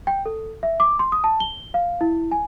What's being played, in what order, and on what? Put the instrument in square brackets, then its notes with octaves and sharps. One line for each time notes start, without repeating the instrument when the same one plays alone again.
[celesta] G5
A4
E5
D6
C6
D#6
A5
G7
F5
E4
G#5